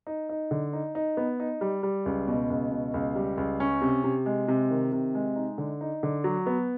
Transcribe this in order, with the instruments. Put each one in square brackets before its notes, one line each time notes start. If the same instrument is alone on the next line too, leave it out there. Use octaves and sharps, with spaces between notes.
[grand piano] D#4
D#4
D3
D#4
D#4
B3
D#4
G3
G3
C#2
B2
C#2
B2
C#2
G3
C#2
C#4
C3
C3
G#3
C3
D#3
C3
G#3
D#4
D3
D#4
D3
F#3
B3